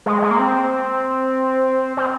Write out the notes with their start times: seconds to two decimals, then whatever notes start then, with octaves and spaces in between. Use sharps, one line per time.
0.06 G#3
0.22 G#3
0.31 A#3
0.39 C4
1.97 C4